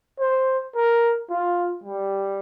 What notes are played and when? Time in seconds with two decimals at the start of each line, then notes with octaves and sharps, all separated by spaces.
0.20 C5
0.75 A#4
1.30 F4
1.84 G3